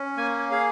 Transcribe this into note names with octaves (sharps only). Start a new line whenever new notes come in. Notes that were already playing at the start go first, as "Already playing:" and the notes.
Already playing: C#4
A#3 G#5
G#4 F5